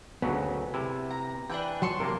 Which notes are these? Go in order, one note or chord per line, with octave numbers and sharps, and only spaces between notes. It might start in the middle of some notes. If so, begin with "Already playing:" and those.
D2 C#3 F#3 B3
C3 E4
A#5
E3 D4 B4 G5
F#3 A5 C6 C#6
C3 A#3 A#4